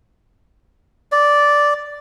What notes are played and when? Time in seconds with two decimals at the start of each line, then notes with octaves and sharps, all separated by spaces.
1.12 D5